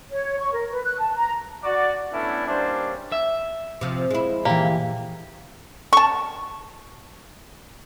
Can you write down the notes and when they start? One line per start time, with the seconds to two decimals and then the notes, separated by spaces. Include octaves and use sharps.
0.12 C#5
0.39 C#6
0.53 A#4
0.72 B4
0.84 F#6
0.99 A5
1.16 A#5
1.64 F#4 D5
2.12 A3 B3 C#4 D4 E4 A4
2.47 G3 A#3 C#4 D4 C5
3.12 E5
3.81 C3 F3
4.11 G#3 E4
4.45 A#2 E3 A#3 G4
5.93 A5 C#6